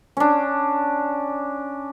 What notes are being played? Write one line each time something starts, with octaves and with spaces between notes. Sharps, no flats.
C#4 D4